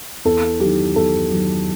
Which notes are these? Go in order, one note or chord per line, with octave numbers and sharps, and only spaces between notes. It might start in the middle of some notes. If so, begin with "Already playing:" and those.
E2 A4
D#3 F#3 G4
E2 A4
D#3 F#3